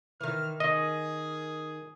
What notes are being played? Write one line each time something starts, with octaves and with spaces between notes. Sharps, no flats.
D#3 E3 F6
D#3 G#4 D#5